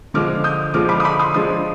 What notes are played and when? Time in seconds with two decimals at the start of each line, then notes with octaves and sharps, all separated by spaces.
0.14 D3 F3 G#3 D6 F6
0.44 D#6 G6
0.74 D3 F3 G#3 D6 F6
0.89 B5 D6
1.00 D#6
1.04 B5 D6
1.19 C6 D#6
1.34 F3 G#3 D4 C6 D#6